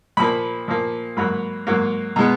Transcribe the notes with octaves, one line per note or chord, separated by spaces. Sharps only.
A#2 F3 A#3 B5
A#2 F3 A#3
G#2 F#3 A#3 B5
G#2 F#3 A#3
B2 G#3 B3 A#5